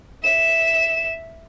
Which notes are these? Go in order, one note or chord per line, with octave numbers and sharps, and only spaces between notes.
E5 E7